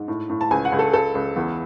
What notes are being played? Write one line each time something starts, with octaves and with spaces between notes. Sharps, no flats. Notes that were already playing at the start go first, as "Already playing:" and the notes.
Already playing: G#2
A2
A2
A5
C#2 G#5
F#5
C#2
A4
C#2 A4
C#2
E2